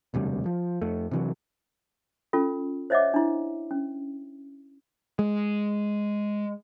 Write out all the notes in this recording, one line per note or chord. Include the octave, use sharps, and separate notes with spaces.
E1 D2 C3 G3
F3
F2 A3
C3 E3 F#3
C#4 F4 A4
C5 C#5 D#5 E5 F#5 D6
D4 E4
C#4
G#3